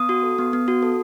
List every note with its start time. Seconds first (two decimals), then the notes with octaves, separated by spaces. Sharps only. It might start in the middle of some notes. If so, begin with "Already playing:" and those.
Already playing: B3 D#6
0.09 F#4
0.23 A4
0.38 B3
0.53 B3
0.68 F#4
0.83 A4